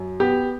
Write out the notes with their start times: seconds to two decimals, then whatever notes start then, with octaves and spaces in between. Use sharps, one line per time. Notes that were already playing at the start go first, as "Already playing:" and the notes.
Already playing: F#2
0.20 B3 G4